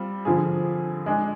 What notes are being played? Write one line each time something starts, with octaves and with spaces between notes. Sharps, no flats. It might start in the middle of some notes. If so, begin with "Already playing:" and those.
Already playing: G3 C4 F4
D3 F3 C4 F4 G#4
G#3 D4 G#4